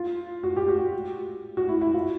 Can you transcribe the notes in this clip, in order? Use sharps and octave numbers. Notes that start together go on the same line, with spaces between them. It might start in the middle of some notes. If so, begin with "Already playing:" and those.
Already playing: F4
F#4
G4
F#4
F#4
E4
E4
F4